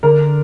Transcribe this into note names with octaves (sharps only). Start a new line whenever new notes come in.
D3 A#4